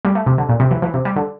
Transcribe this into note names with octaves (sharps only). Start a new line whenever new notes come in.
G3
A3
C3
D3
A#2
C3
E3
E3
C3
G3
D3